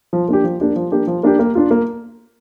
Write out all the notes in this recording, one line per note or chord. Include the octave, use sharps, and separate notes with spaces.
F3
A#3 D4 G4
F3
A#3 D4 G4
F3
A#3 D4 G4
F3
A#3 D4 G4
A#3
D4 F4
A#3